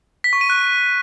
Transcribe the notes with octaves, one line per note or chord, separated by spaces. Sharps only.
B6
C#6
D#7
F#6